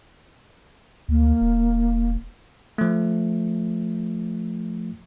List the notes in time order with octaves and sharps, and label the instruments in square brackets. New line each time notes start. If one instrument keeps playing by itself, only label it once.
[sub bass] D2 [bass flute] A#3
[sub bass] E1
[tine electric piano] F3 A3